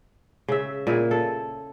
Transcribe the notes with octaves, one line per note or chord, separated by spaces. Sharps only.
C#3 E5
A#2 E4 G#4
A4